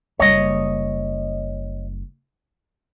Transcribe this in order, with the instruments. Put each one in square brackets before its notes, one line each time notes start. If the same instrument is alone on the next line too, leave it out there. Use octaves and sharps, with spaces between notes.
[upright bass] F#1 G3 [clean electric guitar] C#5 D#5